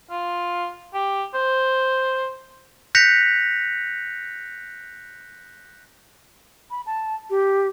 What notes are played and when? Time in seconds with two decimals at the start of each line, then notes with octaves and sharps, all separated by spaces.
0.10 F4
0.94 G4
1.34 C5
2.95 F#6 G6 A#6 B6 C#7 F7
6.71 B5
6.86 A5
7.30 G4